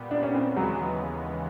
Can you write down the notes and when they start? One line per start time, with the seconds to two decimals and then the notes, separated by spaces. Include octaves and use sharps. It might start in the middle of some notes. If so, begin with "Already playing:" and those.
Already playing: A#2 G3 B3
0.11 D4
0.23 C#4
0.35 C4
0.57 D#2 C#3 E3 F#3 G#3 B3